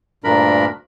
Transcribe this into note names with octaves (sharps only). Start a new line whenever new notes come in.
D2 G2 A#2 D4 A#4 B5